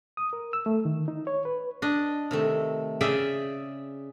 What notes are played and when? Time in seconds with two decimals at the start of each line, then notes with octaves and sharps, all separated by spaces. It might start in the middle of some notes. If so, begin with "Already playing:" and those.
0.17 D#6
0.33 A#4
0.53 E6
0.66 A3
0.85 D#3
1.08 D#4
1.27 C#5
1.45 B4
1.82 D4 D#5
2.31 C3 D#3 A3
3.01 C#3 G#4 D5 E5 G5